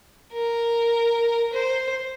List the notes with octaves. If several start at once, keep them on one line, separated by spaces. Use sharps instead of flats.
A#4
C5